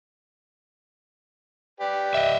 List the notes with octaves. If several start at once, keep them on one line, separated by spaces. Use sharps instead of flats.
G4 B4 D5
D#5 E5